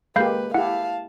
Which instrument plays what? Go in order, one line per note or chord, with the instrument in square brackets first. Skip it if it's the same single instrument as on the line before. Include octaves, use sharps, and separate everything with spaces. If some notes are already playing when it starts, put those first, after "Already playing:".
[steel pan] G#3 A#3 G4 [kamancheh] B4 [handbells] F5 B5 G6
[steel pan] E4 G4 [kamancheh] F5 A5 [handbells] F#5